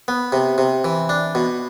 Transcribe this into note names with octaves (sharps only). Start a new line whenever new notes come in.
B3
C3
C3
E3
D4
B2